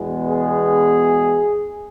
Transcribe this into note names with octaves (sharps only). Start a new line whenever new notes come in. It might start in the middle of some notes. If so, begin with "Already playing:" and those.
Already playing: E2 B2 G#3 B3
G#4